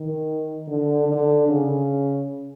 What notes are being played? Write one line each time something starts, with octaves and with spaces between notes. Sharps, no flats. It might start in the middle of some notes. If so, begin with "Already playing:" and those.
Already playing: D#3
D3
D3
C#3